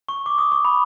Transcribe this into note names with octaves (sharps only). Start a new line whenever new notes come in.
C#6
D6
D#6
C#6
B5